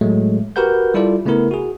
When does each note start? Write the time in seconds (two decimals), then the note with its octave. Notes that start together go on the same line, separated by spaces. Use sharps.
0.01 A2 F#3 G#3 A3
0.56 F#4 G4 A#4 B4 F#5 G6
0.94 G3 E4 F4 A4 D5
1.26 C#3 A3 B3 E4 A#4
1.51 F#4 G#4